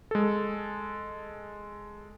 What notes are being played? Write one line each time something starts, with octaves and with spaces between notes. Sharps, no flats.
G#3 A4